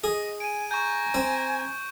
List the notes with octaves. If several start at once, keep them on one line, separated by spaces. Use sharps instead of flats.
G#4 D#5
G#5 D7 D#7
G#5 A#5 C#6 G6
C4